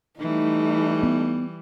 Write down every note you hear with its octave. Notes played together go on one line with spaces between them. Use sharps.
E3 G3 A3 D#4
B3